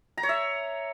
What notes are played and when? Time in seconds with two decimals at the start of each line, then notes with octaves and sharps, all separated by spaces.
0.17 A#5
0.23 C#5
0.29 E5